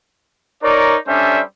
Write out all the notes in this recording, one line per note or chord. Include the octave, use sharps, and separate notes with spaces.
D#4 A#4 C#5 D5
G3 C#4 D4 A4 C5 E5